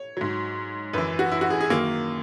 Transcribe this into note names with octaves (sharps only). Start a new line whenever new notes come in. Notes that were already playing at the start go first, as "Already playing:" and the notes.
Already playing: C#5
G#2 F#3
F#2 E3 B4
F#4
E4
F#4
G#4
G#4
F#2 D#3 F#3 A#3